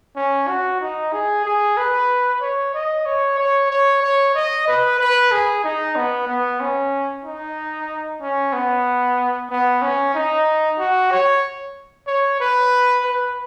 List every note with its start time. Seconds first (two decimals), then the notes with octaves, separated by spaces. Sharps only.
0.16 C#4
0.48 F#4
0.81 D#4
1.13 G#4
1.46 G#4
1.77 B4
2.41 C#5
2.74 D#5
3.06 C#5
3.38 C#5
3.70 C#5
4.02 C#5
4.35 D#5
4.67 B4
4.99 B4
5.31 G#4
5.64 D#4
5.96 B3
6.28 B3
6.60 C#4
7.25 D#4
8.21 C#4
8.53 B3
9.50 B3
9.82 C#4
10.15 D#4
10.79 F#4
11.11 C#5
12.07 C#5
12.40 B4
13.04 B4